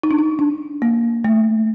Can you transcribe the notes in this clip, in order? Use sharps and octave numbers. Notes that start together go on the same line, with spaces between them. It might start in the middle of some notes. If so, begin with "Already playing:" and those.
D#4
D4
D#4
D4
A#3
A3